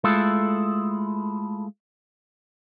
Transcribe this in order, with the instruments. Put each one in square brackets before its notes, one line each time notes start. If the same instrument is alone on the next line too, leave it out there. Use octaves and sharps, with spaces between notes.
[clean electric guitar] G#3 A3 E4 F4 A4